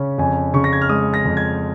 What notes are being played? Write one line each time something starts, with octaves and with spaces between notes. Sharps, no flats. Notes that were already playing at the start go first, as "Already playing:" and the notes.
Already playing: C#3 C#4
F2 G#5
C#3 C#6
A#6
G#6
F6
G#3 D#6
A#6
F2
G#6